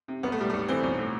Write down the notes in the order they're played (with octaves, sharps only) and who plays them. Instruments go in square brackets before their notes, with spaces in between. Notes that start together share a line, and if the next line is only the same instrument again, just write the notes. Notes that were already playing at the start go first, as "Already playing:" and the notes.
[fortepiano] C3
B1 B3
A3
A2 G3
B1 A3
E3 C4
B1
A2